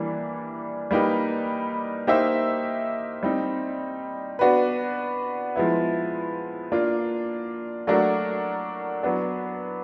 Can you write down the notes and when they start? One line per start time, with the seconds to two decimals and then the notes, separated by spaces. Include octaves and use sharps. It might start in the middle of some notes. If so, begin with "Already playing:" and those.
Already playing: E3 G3 A#3 D4
0.91 G3 A#3 D#4 G4 B4
2.07 A#3 D#4 G4 C5 E5
3.23 G3 C4 D#4
4.39 B3 D4 F#4 B4
5.56 F3 G#3 B3 E4
6.72 A#3 D4 F4
7.87 F#3 A3 D4 F#4 A#4
9.03 F#3 B3 D4